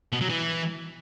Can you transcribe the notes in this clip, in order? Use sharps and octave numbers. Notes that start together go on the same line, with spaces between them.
B2
F#3
E3